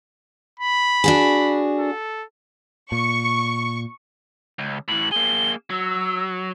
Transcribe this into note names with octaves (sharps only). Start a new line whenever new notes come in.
B5
D4 F#4 G#4
A4
A#2 C#6
C#2
A2 E3 F#7
A#3 G#4 G7
F#3 E6